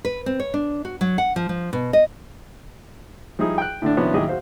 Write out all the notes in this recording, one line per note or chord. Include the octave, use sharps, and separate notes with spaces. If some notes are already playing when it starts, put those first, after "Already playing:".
B4
C4
C#5
D4
F#4
F#3
F#5
F3
F3
B2
D#5
F3 G3 D#4 E4 G#4
G5 F#6
A2 D3 A3 D4
C3 D#3 F3 B3 C#4 D4
D#2 A2 F#3 G4 G#4 D#5
F#4 C5 F5